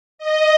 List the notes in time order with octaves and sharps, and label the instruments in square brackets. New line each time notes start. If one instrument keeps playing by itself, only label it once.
[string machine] D#5